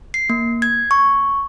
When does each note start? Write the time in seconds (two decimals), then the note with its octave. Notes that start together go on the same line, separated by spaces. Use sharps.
0.14 C7
0.30 A#3
0.62 G#6
0.91 C#6